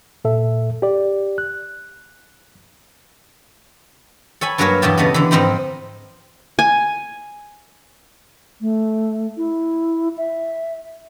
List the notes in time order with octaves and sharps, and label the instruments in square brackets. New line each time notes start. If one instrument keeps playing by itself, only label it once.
[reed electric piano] A#2 A4 E5
G4 D5
F#6
[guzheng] A4 C#5 G#5 B5
G2 F#3 A#3 A#4 B4 C#5
E2 G2 B2 E4 G4 A5
C#3 A3 B3 E4 D#5
D3 E3
G#2 F3 C4 D#4 G5 B5
[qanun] G#5
[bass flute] A3
E4
E5